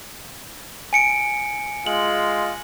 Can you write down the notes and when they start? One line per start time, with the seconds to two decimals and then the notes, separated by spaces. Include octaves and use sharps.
0.93 G#5 C#7 D7
1.86 G#3 F4 F#7